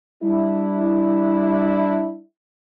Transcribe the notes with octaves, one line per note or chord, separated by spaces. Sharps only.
G3 D4 E4